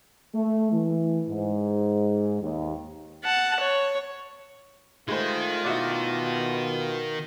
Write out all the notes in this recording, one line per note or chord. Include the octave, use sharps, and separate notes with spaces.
A3
E3
G#2
D#2
F#5 A5
C#5
D#3 G#3 A3 F4 C5
B2 E4 F#4 D5